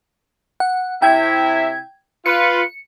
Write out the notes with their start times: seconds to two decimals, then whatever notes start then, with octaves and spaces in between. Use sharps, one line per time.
0.60 F#5
1.02 C3 E4 E5 G5 G#6
2.26 F4 B4 C#7